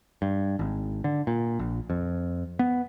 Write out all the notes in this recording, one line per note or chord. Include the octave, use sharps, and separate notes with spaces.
G2
G#1
D3
A#2
A#1
F2
B3